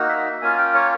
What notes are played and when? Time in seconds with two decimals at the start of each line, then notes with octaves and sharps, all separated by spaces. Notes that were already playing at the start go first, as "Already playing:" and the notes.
Already playing: A#3 D#4 F#4
0.09 E5
0.42 A#3 C#4 F4 G#5
0.58 G5
0.74 C#5